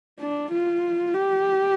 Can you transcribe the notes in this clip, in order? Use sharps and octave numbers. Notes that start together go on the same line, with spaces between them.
D4
F4
G4